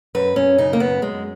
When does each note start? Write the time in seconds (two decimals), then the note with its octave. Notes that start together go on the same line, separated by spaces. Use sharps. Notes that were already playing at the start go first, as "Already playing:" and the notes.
0.15 F#2 B4
0.36 F#2 C#4
0.58 C#3 D#4
0.73 A#3
0.80 F#2 B3
1.02 F#2 G#3